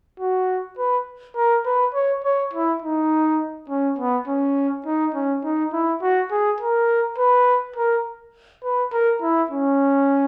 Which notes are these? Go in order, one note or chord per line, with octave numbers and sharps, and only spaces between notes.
F#4
B4
A#4
B4
C#5
C#5
E4
D#4
C#4
B3
C#4
D#4
C#4
D#4
E4
F#4
G#4
A#4
B4
A#4
B4
A#4
E4
C#4